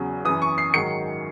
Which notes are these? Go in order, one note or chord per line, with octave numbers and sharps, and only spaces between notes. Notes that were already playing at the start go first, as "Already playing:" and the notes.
Already playing: E2 C#3 F#3
F#2 E3 D#6
C#6
C7
G#2 D#3 F#3 C#7